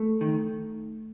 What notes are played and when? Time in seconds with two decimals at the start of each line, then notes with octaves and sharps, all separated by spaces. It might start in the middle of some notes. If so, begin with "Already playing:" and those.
Already playing: A3
0.21 D#3